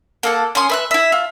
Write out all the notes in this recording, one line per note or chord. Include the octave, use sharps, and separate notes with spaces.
A#3 A4 F#5
C#4 G#5 C6 D#6
B4 E5 F#6
E4 E5
F4